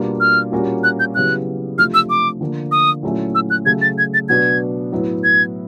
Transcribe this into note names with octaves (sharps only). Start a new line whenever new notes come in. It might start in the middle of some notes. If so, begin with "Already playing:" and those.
Already playing: B2 G3 A#3 D4 F4
F6
A#2 G3 A#3 C#4 F#4
F#6
G6
C#3 F#3 B3 E4 G4 F#6
C3 F3 A3 D4 F4 F6
E6
D6
D3 F3 A#3
D#6
A#2 F#3 A3 C#4 E4
E6
F#6
C#3 F#3 A3 G#6
A6
G#6
A6
B2 F#3 B3 D4 G#6
A2 F#3 B3 E4
G#6